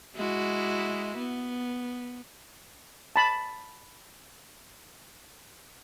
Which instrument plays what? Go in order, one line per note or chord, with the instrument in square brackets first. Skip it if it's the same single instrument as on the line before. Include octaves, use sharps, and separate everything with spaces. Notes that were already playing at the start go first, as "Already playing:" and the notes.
[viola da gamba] G#3 E4 F#4
B3
[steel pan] A5 B5